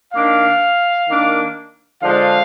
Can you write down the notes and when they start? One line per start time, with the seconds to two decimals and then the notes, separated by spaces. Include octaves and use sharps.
0.13 D#3 A#3 D4 F5
1.08 D#3 A#3 D4
2.02 D3 F3 G#3 D4 F5